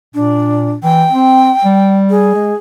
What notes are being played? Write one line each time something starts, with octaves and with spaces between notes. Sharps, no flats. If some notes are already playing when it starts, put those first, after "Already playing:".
A#2 D4
E3 G5
C4
G3
G#4
G#3